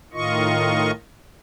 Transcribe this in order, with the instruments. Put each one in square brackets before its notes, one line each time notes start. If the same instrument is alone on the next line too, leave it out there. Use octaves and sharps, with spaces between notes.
[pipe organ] A2 D#3 F4 D#5 C#6